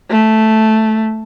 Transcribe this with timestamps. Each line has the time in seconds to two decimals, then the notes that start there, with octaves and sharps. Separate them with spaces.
0.11 A3